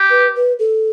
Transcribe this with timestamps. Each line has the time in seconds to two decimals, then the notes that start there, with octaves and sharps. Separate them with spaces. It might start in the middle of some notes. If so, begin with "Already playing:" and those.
Already playing: G4
0.10 B4
0.36 B4
0.59 A4